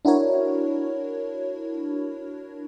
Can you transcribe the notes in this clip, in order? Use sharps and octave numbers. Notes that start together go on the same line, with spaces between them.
D4 E4 F#4 A#4 C#5